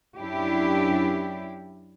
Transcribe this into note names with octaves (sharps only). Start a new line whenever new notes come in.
F#2 D4 E4 G4